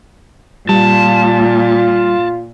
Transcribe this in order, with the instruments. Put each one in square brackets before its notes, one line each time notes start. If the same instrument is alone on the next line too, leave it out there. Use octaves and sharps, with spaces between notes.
[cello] A#2 [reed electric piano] G3 [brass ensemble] F4 [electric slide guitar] A5